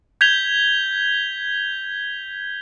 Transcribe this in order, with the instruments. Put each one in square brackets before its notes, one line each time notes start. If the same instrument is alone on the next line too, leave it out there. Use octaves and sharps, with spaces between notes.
[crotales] G6 G#6 B6 F7 G7